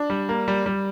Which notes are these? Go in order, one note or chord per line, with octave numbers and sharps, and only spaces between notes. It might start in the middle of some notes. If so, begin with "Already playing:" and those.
Already playing: D4
G3
A#3
G3
G3